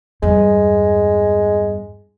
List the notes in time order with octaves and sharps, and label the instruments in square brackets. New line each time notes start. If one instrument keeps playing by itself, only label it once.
[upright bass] E2 G2 [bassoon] G#3